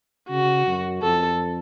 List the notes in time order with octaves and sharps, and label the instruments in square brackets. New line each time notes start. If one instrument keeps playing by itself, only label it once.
[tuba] C#3 [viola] F#4
[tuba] F#2
[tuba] F2 [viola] A4